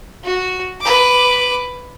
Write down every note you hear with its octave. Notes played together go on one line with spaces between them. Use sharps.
F#4
B4 D6